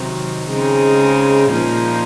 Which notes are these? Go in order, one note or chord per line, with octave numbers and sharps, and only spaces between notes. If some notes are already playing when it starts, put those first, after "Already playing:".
Already playing: C3 D#3 F#3 C4 D#4
C#3 G#3 C4 D#4
A#2 F3 A#3 D#4